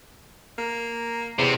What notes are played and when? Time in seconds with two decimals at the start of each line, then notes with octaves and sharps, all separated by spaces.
0.58 A#3
1.39 E2 C3